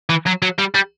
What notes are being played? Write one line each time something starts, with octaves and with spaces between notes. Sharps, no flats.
E3
F#3
F#3
G3
G3